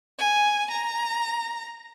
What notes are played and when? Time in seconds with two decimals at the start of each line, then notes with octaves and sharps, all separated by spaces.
0.19 G#5
0.71 A#5